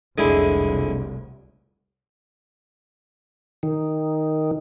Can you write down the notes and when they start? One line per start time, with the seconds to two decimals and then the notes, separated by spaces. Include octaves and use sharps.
0.18 F1 C2 D3 G#3 E4
3.63 D#3